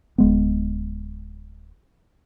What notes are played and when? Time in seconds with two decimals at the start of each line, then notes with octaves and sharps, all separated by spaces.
0.18 D1 G#3 B3